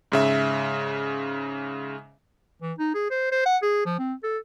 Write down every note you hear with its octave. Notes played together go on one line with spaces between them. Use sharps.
G#2 C#3 E5
E3
D#4
G#4
C5
C5
F#5
G#4
F3
C4
A4